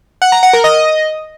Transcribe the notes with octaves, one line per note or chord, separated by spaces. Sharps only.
F#5
A#5
F#5
A#4
D#5